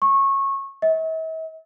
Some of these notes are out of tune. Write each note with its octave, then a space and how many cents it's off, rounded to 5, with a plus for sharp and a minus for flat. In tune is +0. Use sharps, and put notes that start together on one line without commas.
C#6 -20
E5 -45